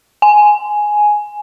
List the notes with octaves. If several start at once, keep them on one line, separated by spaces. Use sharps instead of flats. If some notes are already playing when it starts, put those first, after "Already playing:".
G#5